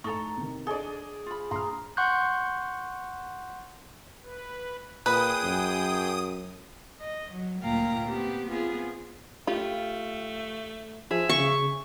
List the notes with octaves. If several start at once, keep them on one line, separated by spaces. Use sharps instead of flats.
A2 D#4 A4 A#5 C#6 G7
C3 D#3
D4 G#4 A4 D5 D#5 G7
F4 B5
A#1 A#5 C6 F6
F#5 C6 C#6 F#6 G6
B4
A#2 G#4 B4 G5 D#6
F#2
D#5
F#3
D2 A#2 A#3 F5 G5 A#5
B3 C4 G4
B3 C4 F4 G#4
A3 F4 G4
F3 G#4 E5
C#3 C#6